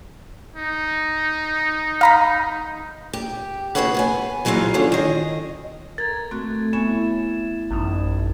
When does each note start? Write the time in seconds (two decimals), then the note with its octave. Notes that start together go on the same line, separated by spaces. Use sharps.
0.56 D#4
2.01 F5 A#5 B5
3.13 G4
3.75 G#2 B2 G#4 B4 C#5 F#5
3.94 B3 B4 G#5
4.45 E3 F#3 G#3 C4 D#4 F4
4.74 D3 E3 F#3 C#4 F4 G#4
4.92 D#3 D#5
5.98 A#4 G#6 A6
6.31 A3 C4 F#4
6.73 B3 E4 C#5 G#5 E7
7.71 A1 F#2 D#4